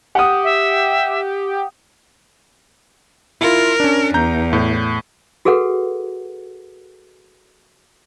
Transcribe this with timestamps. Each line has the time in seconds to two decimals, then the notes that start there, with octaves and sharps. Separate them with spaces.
0.15 G4 F#5 D#6
0.44 E5
3.41 E4 F4 A#4
3.80 C#4 D4
4.14 E2 A#5 G6
4.53 A2
5.45 F#4 G#4 A4 B4 F#5